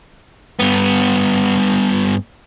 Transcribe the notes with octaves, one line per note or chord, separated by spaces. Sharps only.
G2 B3